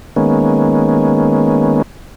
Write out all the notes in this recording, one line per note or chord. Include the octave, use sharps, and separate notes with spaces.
D#3 G#3 A#3 B3 C#4